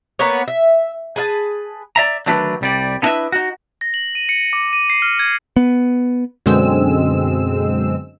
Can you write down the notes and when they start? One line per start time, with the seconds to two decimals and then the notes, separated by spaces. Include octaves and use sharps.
0.19 A#3 B3 B4 C#5
0.48 E5
1.16 G#4 B4 E5 A5
1.96 D5 E5 A#5
2.26 D3 D#3 F#3 A3 D4 B4
2.61 C2 G3 D5
3.02 B3 D4 E4 B4 D#5 E5
3.32 D#4 F#4
3.81 A#6
3.94 F#7
4.15 D#7
4.29 C#7
4.53 D6
4.73 D#7
4.90 C7
5.02 F6
5.19 G#6
5.56 B3
6.46 F#2 B2 D3 G#3 C4 E6